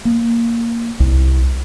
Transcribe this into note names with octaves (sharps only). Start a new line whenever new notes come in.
A#3
C2